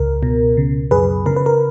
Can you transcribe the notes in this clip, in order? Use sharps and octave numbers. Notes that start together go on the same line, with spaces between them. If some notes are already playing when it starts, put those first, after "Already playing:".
Already playing: C#2 C#3 A#4
B2
C#3
F#2 G#4 B4
C#3 A#4
B4
A#4